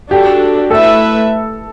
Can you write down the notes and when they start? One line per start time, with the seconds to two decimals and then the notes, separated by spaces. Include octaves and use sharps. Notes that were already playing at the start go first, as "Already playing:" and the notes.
0.11 D4 F#4 G4 A4
0.70 A3 E4 A4 B4 E5